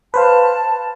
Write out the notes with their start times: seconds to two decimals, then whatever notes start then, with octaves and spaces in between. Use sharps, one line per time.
0.14 B4 C5 F5 A5